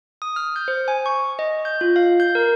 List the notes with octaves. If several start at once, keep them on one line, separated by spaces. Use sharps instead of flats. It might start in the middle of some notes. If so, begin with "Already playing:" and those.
D#6
F6
G6
C5
G#5
C#6
D#5
G6
F4
F5
G6
A#4